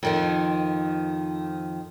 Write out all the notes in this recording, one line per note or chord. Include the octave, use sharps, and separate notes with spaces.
F2 D#3 F3